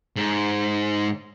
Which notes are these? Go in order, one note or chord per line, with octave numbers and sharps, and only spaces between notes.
G#2